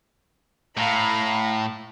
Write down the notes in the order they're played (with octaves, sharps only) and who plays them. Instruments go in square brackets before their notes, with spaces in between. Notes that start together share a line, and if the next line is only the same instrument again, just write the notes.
[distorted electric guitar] A2 [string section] F5 A#5 B5